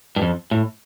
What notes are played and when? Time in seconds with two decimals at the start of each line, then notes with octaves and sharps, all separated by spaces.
0.16 G2
0.22 F2
0.51 A2